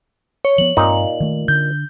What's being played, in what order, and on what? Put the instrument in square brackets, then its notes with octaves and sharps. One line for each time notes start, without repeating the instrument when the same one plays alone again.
[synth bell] C#5
[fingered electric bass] F3 B3 [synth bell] F#7
[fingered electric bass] G2 C4 [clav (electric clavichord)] A#2 D#4
[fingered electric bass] D#3 A3
[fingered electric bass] D3 [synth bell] G6